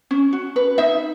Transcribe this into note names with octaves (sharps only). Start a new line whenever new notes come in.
C#4
F#4
B4
D#4 E5